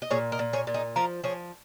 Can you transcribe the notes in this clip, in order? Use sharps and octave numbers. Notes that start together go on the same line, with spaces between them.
D#5
A#2 G#4 C#5
A#4 D#5
A#2
G#4 C#5
A#2
D#4 G#4
F3 F4 A#4
F3 G#4 C#5